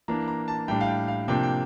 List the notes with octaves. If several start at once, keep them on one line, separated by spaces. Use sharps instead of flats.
E3 A#3 D4 A#5
A#5
A5
A2 G3 D4 G5
F5
G5
F5
C3 F3 A#3 D4 G5
G5